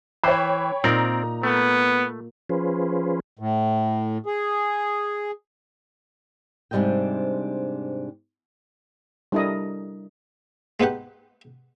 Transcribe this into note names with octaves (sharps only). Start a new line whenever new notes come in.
E3 C5 C#5 G5 B5
A#2 C4 D#4 A#4 D5 A#5
A3 B3
F3 C#4 F4 G#4 B4 C5
A2
G#4
G#2 C3 G3 D4 D#5 G5
G3 D4 E4 A4 A#4 D#5
G#3 B3 D#4 G4 F#5